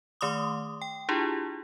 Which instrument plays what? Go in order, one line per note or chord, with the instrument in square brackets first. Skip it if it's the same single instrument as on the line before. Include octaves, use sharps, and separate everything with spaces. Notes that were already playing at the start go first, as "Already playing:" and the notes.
[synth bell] D#3 A3 C6 D6 D#6
G5
D4 E4 F4 G4 G#4